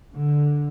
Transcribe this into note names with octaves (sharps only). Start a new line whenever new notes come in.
D3